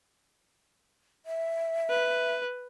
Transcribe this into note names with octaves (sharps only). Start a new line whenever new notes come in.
E5
B4